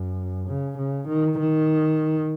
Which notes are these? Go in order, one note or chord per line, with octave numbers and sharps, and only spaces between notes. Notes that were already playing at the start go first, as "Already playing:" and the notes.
Already playing: F#2
C#3
C#3
D#3
D#3